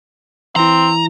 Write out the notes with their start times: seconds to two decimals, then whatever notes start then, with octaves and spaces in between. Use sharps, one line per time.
0.56 E3 C4 E4 A#5